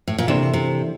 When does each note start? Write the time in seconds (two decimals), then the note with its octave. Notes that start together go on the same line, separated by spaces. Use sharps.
0.08 A2
0.18 A#2
0.28 C3 E3 A#3 D4 A4 C5
0.53 C3